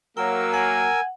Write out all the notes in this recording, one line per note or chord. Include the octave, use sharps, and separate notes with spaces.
F#3 A#3 A#4 G5 E6
F#5 G#5